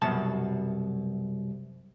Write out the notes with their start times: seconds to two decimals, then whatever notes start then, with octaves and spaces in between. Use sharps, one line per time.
0.02 C2 F#2 B2 A5